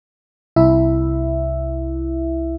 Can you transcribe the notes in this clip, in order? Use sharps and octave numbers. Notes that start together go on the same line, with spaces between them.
C2 E4 E5